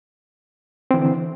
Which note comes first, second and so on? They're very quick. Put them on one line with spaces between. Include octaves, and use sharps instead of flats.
C4 E3 D3